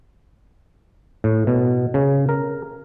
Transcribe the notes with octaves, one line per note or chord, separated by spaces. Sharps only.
A2
B2
C#3
A#4